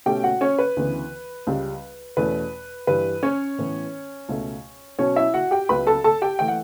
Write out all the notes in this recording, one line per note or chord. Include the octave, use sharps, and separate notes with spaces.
B2 A3 C#4 G4 G5
F#4 F#5
C#4 C#5
B4
D2 C#3 E3 B3
C#2 C#3 G3
E2 B2 A3 C#4 B4
G2 E3 G3 B4
C#4 C#5
A2 E3 B3
C#2 B2 A3
B2 F#3 C#4 C#5
E4 E5
F#4 F#5
G4 G5
C#2 C#3 F#3 B3 B4 B5
A4 A5
A4 A5
G4 G5
E3 A3 G5
F#5